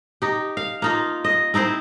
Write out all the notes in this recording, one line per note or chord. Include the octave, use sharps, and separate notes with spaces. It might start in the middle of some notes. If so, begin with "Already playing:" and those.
D#4 G4
F5
A#3 D#4 F4
D#5
C4 D#4 E4 C5